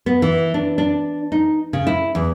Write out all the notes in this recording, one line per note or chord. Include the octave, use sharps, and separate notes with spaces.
B3
E3
D4
D4
D#4
C#3
E4
E2